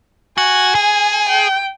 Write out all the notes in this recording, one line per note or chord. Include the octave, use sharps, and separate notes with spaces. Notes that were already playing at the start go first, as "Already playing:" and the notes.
F#4 G#5
G#4
G5